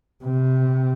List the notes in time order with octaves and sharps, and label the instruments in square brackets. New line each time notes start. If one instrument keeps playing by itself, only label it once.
[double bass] C3